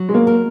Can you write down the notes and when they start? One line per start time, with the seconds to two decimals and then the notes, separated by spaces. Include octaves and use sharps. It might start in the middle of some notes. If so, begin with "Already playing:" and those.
Already playing: F#3
0.09 G#3
0.14 A#3
0.27 A#4